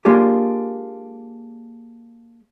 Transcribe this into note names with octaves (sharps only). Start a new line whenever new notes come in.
G#3 A#3 D4 F4 G4 G#4